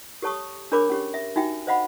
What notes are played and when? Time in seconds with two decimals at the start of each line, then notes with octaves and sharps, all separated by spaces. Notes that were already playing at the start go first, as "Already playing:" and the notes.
0.22 G4 A4 C#5 A5 C#6 D#6
0.72 D4 G#4 A#4 C#5 B5 D6
0.89 C#4 G4 C#5
1.14 E5
1.36 D#4 F#4 E5 G5
1.67 C5 D#5 F5 F#5 B5